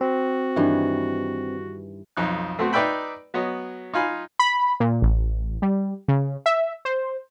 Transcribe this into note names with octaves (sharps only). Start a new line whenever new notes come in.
C4 F#4
G2 D#3 E3
B1 F2 D#4 F#6
A3 B3 C4 F#4
D#4 B4 D5 E5 G5 B5
F#3 B3 C#5 D#5
D#4 F4 F5 G#5 B5
B5
A#2
A1
G3
C#3
E5
C5